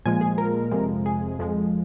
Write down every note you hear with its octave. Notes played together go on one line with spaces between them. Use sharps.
A#2 F3 G#3 G#5
G#4
A#4
F2 C3 F3 G#3
G#4
F2 F3 G#3